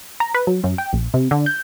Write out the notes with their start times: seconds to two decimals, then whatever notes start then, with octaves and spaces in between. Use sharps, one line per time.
0.20 A#5
0.34 B4
0.47 F#3
0.64 F#2
0.78 G5
0.93 A#1
1.14 C3
1.31 D3
1.46 G6